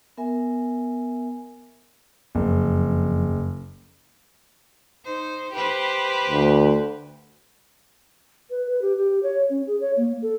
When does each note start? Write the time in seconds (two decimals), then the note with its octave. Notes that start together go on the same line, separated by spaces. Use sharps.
0.18 B3 A#4 E5 G#5
2.35 F#1 F2
5.05 D#4 C5
5.52 G4 B4 C5
6.30 D2
8.50 B4
8.70 B4
8.82 G4
8.97 G4
9.23 C#5
9.50 C#4
9.67 G#4
9.80 C#5
9.97 A#3
10.22 A4